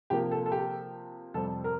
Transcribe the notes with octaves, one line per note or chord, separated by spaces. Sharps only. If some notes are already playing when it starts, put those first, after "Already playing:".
C3 F3 A#3 G4
A4
A4
G4
F2 C3 G3 C4 A4
A#4